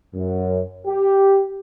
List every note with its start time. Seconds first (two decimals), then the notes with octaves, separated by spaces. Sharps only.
0.15 F#2
0.87 G4